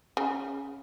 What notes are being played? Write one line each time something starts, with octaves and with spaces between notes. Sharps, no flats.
C#3